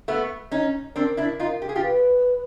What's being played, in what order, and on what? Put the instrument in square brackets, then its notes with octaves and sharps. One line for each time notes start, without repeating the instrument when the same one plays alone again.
[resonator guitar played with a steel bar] A3 B3
C#4 D#4
[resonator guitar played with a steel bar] C4 D4 [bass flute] A#4
[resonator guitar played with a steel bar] D4 E4
D#4 F4
G4
G#4
F4 G4
[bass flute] B4